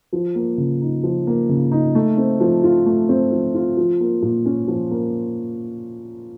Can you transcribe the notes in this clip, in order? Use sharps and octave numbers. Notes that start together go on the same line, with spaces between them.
F3
A#3
C#3
D#4
F3
A#3
C#3
D#4
A3
C4
F3
F4
A3
C4
F3
F4
F3
A#3
A#2
C#4
F3
A#3